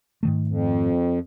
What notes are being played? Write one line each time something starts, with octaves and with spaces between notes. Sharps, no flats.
G#2 D#3 A3
F2